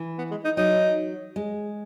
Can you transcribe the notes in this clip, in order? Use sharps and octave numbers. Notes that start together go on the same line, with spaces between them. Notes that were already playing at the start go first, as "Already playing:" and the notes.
Already playing: E3
B3
G#3
D#4
F#3 D#4
G#3